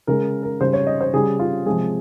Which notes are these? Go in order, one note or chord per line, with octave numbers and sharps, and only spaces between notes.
C#3 G#3 A#4
A#4
C#3 G3 C5
C#5
D#5
C5
C#3 G3 G#4
F4
C3 F3 G#3 G#4